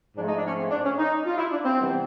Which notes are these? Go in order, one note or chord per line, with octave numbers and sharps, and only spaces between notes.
G#2 F3 A3 D4
D#4
D4
C#4
C4
D4
C#4
D#4
F4
E4
D4
C4
C3 E3 G3 B3